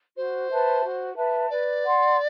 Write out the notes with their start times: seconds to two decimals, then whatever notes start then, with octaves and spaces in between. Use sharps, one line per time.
0.17 F#4 C5
0.51 B4 E5 A5
0.84 F#4
1.16 B4 E5 A5
1.50 B4 D5
1.84 F#5 C6